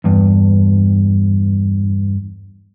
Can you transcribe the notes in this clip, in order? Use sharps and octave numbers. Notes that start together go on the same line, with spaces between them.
E2 G2